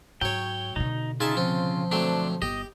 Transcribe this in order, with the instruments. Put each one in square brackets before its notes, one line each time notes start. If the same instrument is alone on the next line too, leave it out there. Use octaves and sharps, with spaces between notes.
[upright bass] G#2 [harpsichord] F#3 C#5 [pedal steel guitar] G5
[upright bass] B2 D3 [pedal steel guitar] D#4
[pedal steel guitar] C#3 F4 [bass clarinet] D#4 [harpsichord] G#4 E5 A5
[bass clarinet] F3 [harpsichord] C4
[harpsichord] F#3 A3 C4 [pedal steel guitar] D4
[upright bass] G1 [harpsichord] G4 [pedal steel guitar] D#5